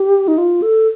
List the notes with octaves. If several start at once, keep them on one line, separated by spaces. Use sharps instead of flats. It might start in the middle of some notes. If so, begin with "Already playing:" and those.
Already playing: G4
D#4
F4
A4